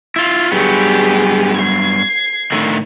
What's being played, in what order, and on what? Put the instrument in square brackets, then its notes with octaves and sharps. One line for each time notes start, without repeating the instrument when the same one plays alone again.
[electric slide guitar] E4 F4
[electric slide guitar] G2 F#3 B3 [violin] G4 G#4
[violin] G#6 C7
[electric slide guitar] A2 D3 D#3